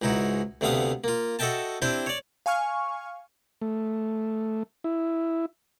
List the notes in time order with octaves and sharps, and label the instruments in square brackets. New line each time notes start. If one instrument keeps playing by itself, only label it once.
[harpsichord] C#2 G#2 D#4 E4 F#4
D2 C3 A3 B3 F5 D#6
A#3 F4
F#4 A4 D#5 E5 G5 A5
C4 D4 E4 G4 C5
C#5 D5
[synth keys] F5 G#5 C#6 F6
[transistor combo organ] A3
E4